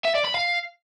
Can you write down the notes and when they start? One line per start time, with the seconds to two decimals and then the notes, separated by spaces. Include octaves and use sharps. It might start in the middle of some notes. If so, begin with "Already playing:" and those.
0.05 E5
0.14 D5
0.24 B5
0.34 F5